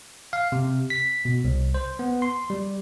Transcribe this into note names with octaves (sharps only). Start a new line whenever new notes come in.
F5
C3
B6
B2
C2
C5
B3
C6
G3